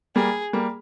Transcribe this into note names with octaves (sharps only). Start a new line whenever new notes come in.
G3 A#3 G#4
G3 A#3